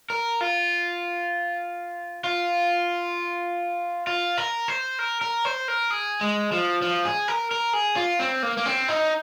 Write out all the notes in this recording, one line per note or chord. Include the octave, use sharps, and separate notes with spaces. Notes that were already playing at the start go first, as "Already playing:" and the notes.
A#4
F4
F4
F4
A#4
C5
A#4
A#4
C5
A#4
G#4
G#3
F3
F3
G#4
A#4
A#4
G#4
F4
C4
A#3
A#3
C4
D#4